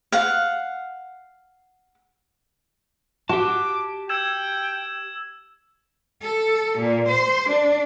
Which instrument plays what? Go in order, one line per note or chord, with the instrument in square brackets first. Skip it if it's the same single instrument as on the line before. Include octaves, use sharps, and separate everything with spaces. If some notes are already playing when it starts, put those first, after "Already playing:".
[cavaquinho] F5 F#5
[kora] F#4 [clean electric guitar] G4 A5 [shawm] D6
[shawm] G5 [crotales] E6 G#6 E7
[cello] A4
A#2
C5
D4